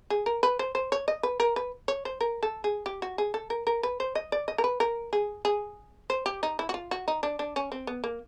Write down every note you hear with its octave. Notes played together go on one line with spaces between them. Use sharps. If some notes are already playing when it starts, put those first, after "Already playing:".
G#4
A#4
B4
C5
C5
C#5
D#5
B4
A#4
B4
C#5
C5
A#4
A4
G#4
G4
F#4
G#4
A4
A#4
A#4
B4
C5
D#5
D5
D#5
A#4
B4
A#4
G#4
G#4
C5
G4
D#4
E4
F#4
F4
F#4
D#4
D4
D4
C#4
C4
B3
A#3